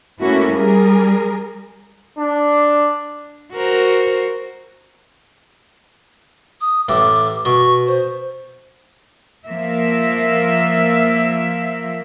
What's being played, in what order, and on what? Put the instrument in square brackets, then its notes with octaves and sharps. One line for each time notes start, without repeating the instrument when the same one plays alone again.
[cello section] A3 A#3 C#4 E4 F#4
G3 G#4 A#4
[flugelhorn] D4
[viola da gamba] F#4 A#4 C5
[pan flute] D#6
[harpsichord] A1 A2 [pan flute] D6
[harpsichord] B2 [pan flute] C#6
[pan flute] C5
[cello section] F3 A#3 E5